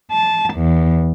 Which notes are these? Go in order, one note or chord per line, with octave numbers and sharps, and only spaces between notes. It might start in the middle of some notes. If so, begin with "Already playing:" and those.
A5
E2